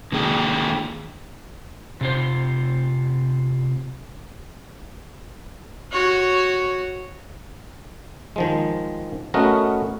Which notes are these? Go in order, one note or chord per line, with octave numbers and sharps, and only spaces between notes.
D3 D#3 A#3 G#4 G5
C3 F4 C5
F#4 C#5
D#3 F3 G#3
A3 B3 C#4 F#4 A#4 D#5